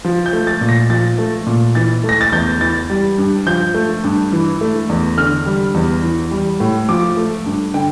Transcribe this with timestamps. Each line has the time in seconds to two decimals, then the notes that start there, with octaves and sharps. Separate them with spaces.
0.05 F3
0.26 G6
0.33 A3
0.47 A6
0.61 A#2
0.69 A#6
0.90 F3 A6
1.18 A3
1.46 A#2
1.75 E3 A6
2.04 A3
2.09 A#6
2.21 A6
2.32 E2 G6
2.61 E3 A6
2.90 G3
3.18 G2
3.47 F3 G6
3.74 A3
4.04 G2
4.32 E3
4.61 A3
4.89 E2
5.18 D3 F6
5.46 G3
5.74 E2
6.03 E3
6.31 G3
6.60 A2
6.89 F3 D6
7.17 A3
7.46 G2
7.74 D3 G5